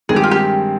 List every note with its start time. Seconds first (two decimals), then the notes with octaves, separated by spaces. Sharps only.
0.09 G2 D#3 G#3 C4 G#4
0.16 G4
0.24 F4
0.31 G4